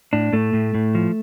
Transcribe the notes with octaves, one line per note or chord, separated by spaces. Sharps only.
A2 D4
A2 A3
A2
A2
F3